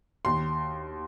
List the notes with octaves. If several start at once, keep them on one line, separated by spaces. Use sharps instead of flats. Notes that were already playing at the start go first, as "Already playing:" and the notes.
D#2 C6